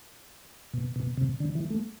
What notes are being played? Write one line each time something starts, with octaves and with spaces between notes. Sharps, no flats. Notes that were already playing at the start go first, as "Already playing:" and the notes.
B2
B2
C3
D3
E3
A3